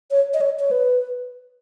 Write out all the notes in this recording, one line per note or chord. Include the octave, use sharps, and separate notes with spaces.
C#5
D#5
C#5
C#5
B4